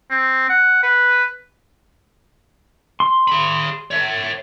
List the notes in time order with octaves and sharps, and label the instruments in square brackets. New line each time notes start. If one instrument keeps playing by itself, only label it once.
[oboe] C4
F#5
B4
[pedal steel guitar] C6
[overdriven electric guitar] G#4 B5
C#5 E5